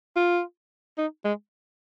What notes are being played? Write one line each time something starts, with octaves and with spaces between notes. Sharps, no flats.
F4
D#4
G#3